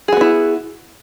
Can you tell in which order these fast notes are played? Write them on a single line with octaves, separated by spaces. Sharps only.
G#4 F#4 B3 E4